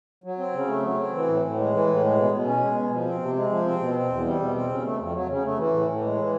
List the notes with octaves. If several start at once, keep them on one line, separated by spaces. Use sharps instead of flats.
F#3
C4
C#3
A3
F#3
C4
E3
A2
A2
G#3
E3
A2
G#3
B2
B2
C#4
G#3
B2
F3
C4
C3
G#3
F3
C4
B2
C4
E2
G3
B2
C4
C#3
A3
F2
F#3
C#3
A3
E3
A2
A2
G#3
E3